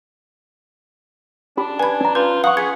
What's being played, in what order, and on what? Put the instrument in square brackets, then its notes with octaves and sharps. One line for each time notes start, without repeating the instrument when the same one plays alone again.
[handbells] C#4 G4 B5 [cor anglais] D4
[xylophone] B4 G#6 [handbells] G#5 B5
[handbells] C#4 A#5
[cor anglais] F4 [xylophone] B4 [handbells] G6
[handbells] F5 C#6 [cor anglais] F#5 [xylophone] D#6
[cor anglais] G#4 [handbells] G#6 B6 [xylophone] C#7